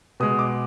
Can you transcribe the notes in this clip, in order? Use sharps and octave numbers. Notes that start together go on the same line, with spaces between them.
B2 G#3 D#6
D6